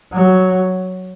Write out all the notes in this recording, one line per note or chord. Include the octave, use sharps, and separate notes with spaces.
F#3